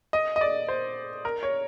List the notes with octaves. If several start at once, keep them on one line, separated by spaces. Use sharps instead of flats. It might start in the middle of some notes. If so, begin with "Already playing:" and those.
D#5
D#5
D5
C5
A#4
C#5